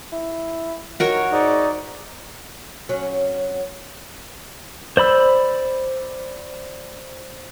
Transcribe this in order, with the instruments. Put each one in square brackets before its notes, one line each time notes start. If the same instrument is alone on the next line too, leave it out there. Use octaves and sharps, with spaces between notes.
[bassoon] E4
[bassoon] D#3 [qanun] F#4 A#4 C#5
[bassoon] G#2 [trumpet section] D#4 D5
[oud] F#3 C#4
[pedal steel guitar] C5 D5 B5 E6